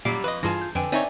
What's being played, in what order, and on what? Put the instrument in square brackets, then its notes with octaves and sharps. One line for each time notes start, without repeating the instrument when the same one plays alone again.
[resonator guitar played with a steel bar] F#2 F#3 G3 [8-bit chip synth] A#2 [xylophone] D6 C7 D7
[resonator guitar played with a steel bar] F2 [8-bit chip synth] B4 D#5
[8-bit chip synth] G2 E3 [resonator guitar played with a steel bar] F4 G#4 A5 [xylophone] A#6
[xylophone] G6
[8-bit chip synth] F2 [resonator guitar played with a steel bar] D3 [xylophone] B4 G5 G#5
[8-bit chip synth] C4 D#4 C#5 [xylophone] D5 E5 G#5